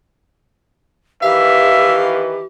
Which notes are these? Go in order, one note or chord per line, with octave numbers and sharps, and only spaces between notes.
D#3 E3 G4 B4 E5 F5